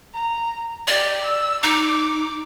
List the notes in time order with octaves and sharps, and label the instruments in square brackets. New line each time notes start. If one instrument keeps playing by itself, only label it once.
[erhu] A#5
[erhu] G4 [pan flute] D5
[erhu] E6
[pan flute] D#4 [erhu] D6